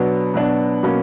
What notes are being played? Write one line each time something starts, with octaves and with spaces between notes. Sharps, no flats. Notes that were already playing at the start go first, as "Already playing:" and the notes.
Already playing: B2 F#3 B3 D4
B2 F#3 B3 D4
B2 F#3 A#3 C#4